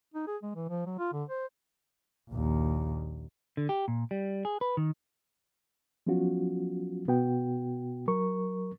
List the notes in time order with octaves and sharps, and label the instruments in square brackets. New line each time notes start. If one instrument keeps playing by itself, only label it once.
[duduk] D#4
G#4
G#3
E3
F3
F#3
F4
D3
C5
[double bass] A#1 D#2
[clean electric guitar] D3
G4
A#2
G3
G#4
B4
D#3
[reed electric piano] F3 F#3 B3 C#4 F4 F#4
B2 B3 F#4 G5
F#3 A#4 C#6